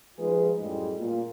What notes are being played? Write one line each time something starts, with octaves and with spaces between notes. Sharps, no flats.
F3 G#3 D#4 F4 G#4 B4
F#2 A2 G3 G#3
A#2